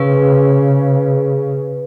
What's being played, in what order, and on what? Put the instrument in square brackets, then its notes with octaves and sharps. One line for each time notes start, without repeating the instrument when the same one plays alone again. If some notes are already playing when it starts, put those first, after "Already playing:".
Already playing: [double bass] C#3 [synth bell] G#4 B4